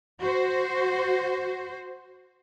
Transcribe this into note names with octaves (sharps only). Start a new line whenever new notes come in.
F#4 C5